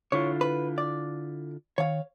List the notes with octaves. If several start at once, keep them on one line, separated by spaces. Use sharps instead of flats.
D3 E4 F4 C#5
B4
D5
D#3 C#5 F5